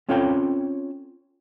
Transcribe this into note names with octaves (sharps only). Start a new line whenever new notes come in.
C4 C#4 F4 A4 C#5 G5